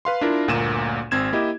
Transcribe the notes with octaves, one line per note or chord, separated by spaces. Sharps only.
B4 F5 C6
D4 E4 F4 A#4
G1 D2 A#2 A#3 D#7 E7
G#1 C4 G#6 E7
A#3 E4 G4 D#5